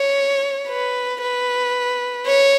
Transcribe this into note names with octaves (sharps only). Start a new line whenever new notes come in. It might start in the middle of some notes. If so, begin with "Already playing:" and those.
Already playing: C#5
B4
B4
C#5